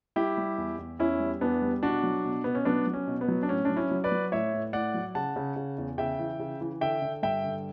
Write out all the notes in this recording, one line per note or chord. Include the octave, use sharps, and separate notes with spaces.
G3 E4 G4
G3
E2
E2
E2 C#4 E4
G3
E2 B3 D4
G3
B2 D4 F#4
F#3
B2
B2 B3
C#4
F#3 B3 D4
F#3
C#4
B2
B3
F#3
D4
A2 C#4
F#3 D4
C#4 E4
F#3
B4 D5
F#3
A2 C#5 E5
A2
A2 D5 F#5
F#3
C#3 F#5 A5
C#3
C#3
E2
C#3 E5 G5
E3
C#3
E3
D3 E5 G5
D3
G2 E5 G5
D3